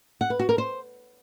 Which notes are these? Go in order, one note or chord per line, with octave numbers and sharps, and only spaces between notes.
F#5
B4
F#4
A#4
C5